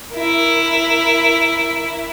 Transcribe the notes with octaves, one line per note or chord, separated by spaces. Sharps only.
E4 A#4